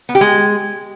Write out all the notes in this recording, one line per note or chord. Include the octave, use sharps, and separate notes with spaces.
B3
G4
G#3